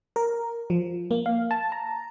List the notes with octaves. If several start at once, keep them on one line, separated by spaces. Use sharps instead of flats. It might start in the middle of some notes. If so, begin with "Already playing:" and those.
A#4
F3
A#3
F5
A5
A#5